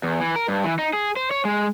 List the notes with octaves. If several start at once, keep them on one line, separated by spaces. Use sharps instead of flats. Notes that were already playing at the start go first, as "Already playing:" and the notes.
E2
E3
A#4
G2
E3
D#4
G#4
C5
C#5
G#3